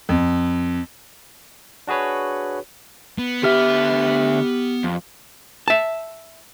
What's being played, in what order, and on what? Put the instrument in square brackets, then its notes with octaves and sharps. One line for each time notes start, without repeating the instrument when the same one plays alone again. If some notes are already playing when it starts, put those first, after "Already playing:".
[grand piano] F2
[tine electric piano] D4 F#4 G#4 B4 C#5
[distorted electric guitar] B3
[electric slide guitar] D3 E5 [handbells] G4 F6
[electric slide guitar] F2
[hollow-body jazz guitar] E5 A5